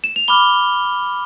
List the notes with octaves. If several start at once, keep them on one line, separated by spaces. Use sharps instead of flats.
E7
F7
B5 D6 F6 G7